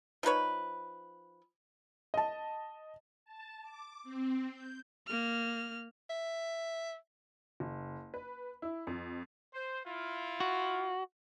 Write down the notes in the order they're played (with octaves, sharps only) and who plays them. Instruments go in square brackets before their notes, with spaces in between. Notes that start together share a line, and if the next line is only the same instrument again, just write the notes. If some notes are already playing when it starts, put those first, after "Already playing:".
[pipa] F3 D#4 B4 C#5
[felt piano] D#5 A5
[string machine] A5
D6
C4
G6
[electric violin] A#3 F6
[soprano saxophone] E5
[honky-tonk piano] F#1
B4
E4
F2
[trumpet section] C5
E4 F4
[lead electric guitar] F#4